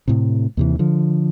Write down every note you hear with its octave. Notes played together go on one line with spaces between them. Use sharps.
A2 C3
D#2 C3 E3
D3 F3